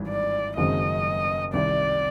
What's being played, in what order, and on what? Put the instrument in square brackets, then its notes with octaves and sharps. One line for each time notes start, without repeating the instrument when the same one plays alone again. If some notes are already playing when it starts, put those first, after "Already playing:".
Already playing: [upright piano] G#1 G2 E3
[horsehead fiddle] D5
[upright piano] F#1 F#2 D#3 G#3 C4 [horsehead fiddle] D#5
[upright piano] C2 C3 D#3 [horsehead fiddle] D5